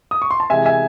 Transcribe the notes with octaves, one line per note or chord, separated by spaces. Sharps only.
D#6
C#6
C6
A5
C3 E3 G#3 E5 G#5
E5 G#5